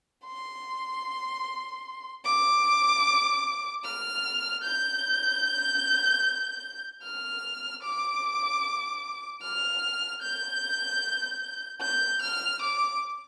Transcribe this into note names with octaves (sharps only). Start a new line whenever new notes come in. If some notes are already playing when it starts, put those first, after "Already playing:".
C6
D6
F6
G6
F6
D6
F6
G6
G6
F6
D6